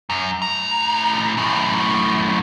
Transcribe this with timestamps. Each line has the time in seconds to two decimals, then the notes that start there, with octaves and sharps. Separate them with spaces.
0.10 F#2
0.42 A2 A#5
1.37 F#2 A2